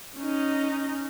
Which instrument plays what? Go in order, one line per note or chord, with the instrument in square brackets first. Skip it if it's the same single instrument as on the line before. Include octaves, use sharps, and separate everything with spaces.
[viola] C#4 D#4